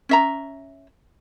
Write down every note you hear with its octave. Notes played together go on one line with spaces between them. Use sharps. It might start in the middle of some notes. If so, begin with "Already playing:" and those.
C#4 E5 A#5